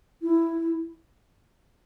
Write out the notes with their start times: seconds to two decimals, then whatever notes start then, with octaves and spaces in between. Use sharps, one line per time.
0.22 E4